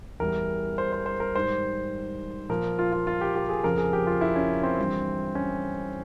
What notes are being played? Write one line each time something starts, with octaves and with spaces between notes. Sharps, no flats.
E2 E3 G3 A#4
C5
C5
C5
A#4
G#2 G3 C5
A#2 F3 A#4
F4
F4
F4
G4
G4
G#4
F2 C#3 F3 A#4
G#4
G4
F4
E4
C#4
C4
G2 E3 G3
C#4